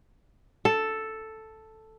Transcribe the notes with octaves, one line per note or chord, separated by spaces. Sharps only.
A4